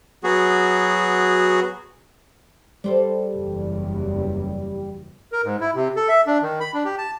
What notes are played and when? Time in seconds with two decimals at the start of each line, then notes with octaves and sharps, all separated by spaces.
0.24 F#3 B3 F#4 G#4
2.84 G3 A4 C5 D5
3.31 F#1 E2
5.32 A#4
5.44 G#2
5.61 E4
5.75 C3
5.96 A4
6.09 E5
6.27 D4
6.42 D#3
6.60 B5
6.74 D4
6.85 G4
6.98 A5